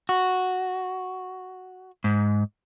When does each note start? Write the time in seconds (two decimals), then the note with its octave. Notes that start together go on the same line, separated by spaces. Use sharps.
0.09 F#4
2.04 G#2